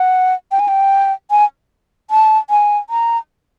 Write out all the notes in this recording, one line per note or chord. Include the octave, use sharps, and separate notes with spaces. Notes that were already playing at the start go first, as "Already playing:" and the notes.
Already playing: F#5
G5
G#5
G5
G#5
A5
G#5
A#5